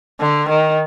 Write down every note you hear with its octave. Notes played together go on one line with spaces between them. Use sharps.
D3
D#3